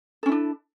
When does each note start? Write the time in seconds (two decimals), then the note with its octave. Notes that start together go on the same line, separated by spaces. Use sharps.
0.23 A4
0.26 C#4
0.29 E4
0.32 D4